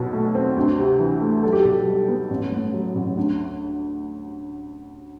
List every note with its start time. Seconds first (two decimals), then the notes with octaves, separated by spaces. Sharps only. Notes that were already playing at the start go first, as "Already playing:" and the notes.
Already playing: B1 B2
0.13 A3
0.35 C4
0.57 D2
0.78 C3
1.00 E3
1.21 A3
1.43 B1 A4
1.52 G4
1.62 B2 A4
1.87 G3
2.08 B3
2.30 A1
2.52 A2
2.74 F#3
2.95 A1
3.17 D2